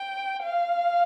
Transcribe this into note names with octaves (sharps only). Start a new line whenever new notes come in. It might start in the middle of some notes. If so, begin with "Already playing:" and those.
Already playing: G5
F5